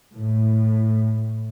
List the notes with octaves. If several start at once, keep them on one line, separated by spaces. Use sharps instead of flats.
A2